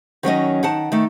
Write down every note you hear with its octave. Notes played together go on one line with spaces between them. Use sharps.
D#3 F#3 C#4 D#5
D#3 F#5 A5
D#3 A3